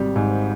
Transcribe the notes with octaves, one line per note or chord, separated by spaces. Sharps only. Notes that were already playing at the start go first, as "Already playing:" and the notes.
Already playing: G#1 C3 G3
G#2